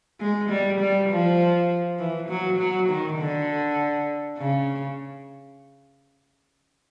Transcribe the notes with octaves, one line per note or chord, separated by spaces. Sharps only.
G#3
G3
G3
F3
E3
F#3
F#3
D#3
D3
C#3